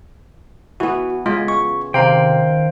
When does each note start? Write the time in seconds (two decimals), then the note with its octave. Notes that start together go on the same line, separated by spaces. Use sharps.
0.80 E3 B3 F#4
1.26 C#3 G#3 F4 G#4
1.48 C#6
1.94 C3 D#3 C5 F5 G5 A#5